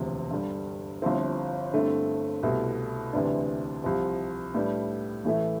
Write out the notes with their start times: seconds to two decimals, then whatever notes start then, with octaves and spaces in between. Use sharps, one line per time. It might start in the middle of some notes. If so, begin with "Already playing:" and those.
Already playing: E1 D2 C3 F3 C4
0.31 G2 D3 G3
1.02 G1 G2 F3 C4 E4
1.72 G2 D3 A3 C4 E4
2.43 C2 B2 A3 E4
3.13 D2 C3 E3 B3 D4
3.84 C2 C3 F3
4.55 A2 G3 B3 D4
5.25 A1 A2 E3 A3 E4